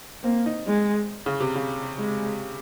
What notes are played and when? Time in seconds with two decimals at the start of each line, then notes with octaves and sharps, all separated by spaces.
0.23 A#3 C4
0.46 D#4
0.67 G#3
1.26 C#3
1.40 C3
1.56 C#3
1.99 G#3